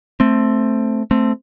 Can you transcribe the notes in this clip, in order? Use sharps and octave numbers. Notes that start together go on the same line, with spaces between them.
A3 C4
A3 C4